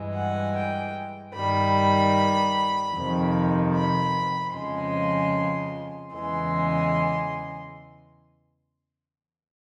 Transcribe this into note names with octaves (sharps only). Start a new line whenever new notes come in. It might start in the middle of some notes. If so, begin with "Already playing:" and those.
Already playing: G2 E3 G#3
F#5
G5
G2 D#3 G3 B5
F2 C3 D#3
B5
F2 C#3 F3 G#3 C6
E2 C#3 E3 G#3 C6